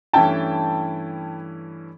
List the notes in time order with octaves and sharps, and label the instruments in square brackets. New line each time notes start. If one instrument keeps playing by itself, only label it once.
[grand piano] G2 E3 A3 C#4 E4 [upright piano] G5 A5